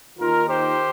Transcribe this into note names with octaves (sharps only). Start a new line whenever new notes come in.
D#2 D#3 F4 A#4
G4 C5